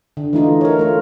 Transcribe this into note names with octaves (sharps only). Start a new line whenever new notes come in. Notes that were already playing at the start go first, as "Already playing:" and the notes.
D3
E3 A3 D#4 F4
A#4 C#5
A3 F4